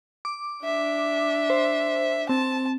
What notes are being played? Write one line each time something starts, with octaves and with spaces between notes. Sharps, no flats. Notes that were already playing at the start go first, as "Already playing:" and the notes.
D6
D4 E5
C5
C4 A5